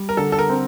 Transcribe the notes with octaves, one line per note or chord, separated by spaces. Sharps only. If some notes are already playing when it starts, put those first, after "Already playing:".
Already playing: G3
A#4
D3 A4
A4
A#4
C4